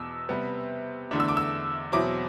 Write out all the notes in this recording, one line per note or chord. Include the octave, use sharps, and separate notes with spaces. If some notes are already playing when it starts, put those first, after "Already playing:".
Already playing: E2 B2 D6 E6
C3 G3 B3
E2 D3 A3 D4
E6
D6
E6
E2 B2 F#3 C4 E4 D6